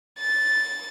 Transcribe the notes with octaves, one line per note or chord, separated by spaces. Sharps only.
A6